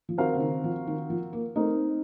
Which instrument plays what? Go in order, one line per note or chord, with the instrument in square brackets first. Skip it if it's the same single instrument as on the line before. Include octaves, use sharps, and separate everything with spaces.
[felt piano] F3
[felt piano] D#3 [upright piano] C4 F#4 A#4 F5
[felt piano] C#3
D#3
F3
D#3
F3
A#3
[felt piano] A3 [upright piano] C4 D#4 A#4 D#5